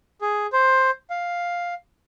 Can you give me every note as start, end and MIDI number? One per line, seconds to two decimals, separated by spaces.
0.21 0.46 68
0.53 0.90 72
1.10 1.74 77